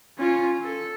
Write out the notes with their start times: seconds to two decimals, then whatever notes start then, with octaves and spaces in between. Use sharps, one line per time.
0.18 C#4 F4
0.62 A4